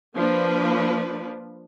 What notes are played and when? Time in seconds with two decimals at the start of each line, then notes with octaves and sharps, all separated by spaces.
0.16 F3 A#3 D4 B4